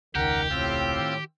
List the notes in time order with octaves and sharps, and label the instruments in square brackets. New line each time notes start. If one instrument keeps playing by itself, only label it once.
[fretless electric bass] E1 C#2 [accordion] D#3 [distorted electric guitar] G4 [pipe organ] F#5 A#5 F6
[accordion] A2 [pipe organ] C4 F4 E6
[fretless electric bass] D#3